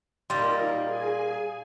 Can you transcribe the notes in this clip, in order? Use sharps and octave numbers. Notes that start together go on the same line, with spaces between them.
A#2 G3 A#3 D#4 F4 A#4 C6
G#4 G#5